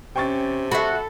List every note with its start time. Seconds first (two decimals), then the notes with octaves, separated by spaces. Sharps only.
0.16 C3 C#4 G5 C#6 A6
0.71 F#4 A4 E5 B5